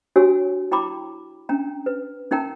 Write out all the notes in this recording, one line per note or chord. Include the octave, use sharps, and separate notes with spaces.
D4 F#4 G4 C#5 G#5 E6
E4 G5 A#5 B5 D6
C#4 D4 G5 A#5
B4
C#4 D#4 A#4 G5 A5 A#5